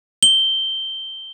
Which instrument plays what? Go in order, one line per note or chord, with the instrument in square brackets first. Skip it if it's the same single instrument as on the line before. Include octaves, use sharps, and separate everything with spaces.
[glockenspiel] G7